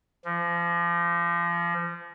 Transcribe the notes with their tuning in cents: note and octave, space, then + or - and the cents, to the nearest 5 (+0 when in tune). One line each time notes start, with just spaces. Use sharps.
F3 -30